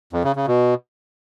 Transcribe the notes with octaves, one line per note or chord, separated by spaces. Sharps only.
F2
C#3
C#3
B2